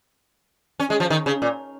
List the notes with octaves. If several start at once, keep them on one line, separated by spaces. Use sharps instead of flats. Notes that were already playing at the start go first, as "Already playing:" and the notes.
C#4
G#3
F3
D#3
C#3
A#2